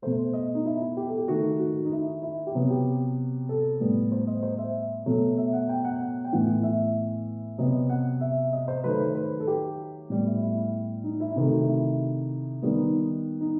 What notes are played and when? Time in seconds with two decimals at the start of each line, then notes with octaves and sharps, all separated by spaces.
0.02 B2 A3 C5
0.33 D#5
0.55 D#4
0.65 E4
0.81 E4
0.97 G4
1.07 A4
1.18 G4
1.28 D#3 A3 F#4
1.59 F#4
1.76 F#4
1.85 D#4
1.91 E4
2.22 E4
2.47 G4
2.54 C3 F#3 B3 F#4
2.70 G4
3.49 A4
3.80 A2 G3 B3
4.12 C5
4.27 D#5
4.43 C5
4.59 E5
5.06 B2 F#3 A3
5.38 E5
5.53 F#5
5.69 G5
5.85 F#5
6.01 F#5
6.24 G5
6.32 A2 E3 B3 F#5
6.63 E5
7.58 C3 F#3 B3 D#5
7.90 F#5
8.21 E5
8.53 D#5
8.68 C5
8.84 D#3 F#3 A3 B4
9.00 C5
9.15 B4
9.40 A4
9.47 G4
10.10 A2 G3 B3
10.26 E4
10.41 E4
11.04 D#4
11.20 E4
11.36 C3 D#3 A3 E4
11.52 F#4
11.68 E4
12.62 D#3 G3 B3
12.78 D#4
13.41 D#4